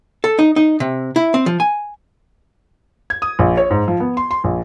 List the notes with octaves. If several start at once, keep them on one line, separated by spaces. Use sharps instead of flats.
A4
D#4
D#4
C3
E4
C4
F3
G#5
G#6
D#6
A#1
C#5
G#2
F3
B3
C6
C6
A#1